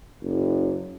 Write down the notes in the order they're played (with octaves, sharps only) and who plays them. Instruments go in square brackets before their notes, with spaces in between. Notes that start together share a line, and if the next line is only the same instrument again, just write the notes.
[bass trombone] F#1